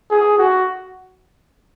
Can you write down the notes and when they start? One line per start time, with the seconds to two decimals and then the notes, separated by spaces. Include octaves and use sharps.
0.11 G#4
0.39 F#4